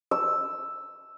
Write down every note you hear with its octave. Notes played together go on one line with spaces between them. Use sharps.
E6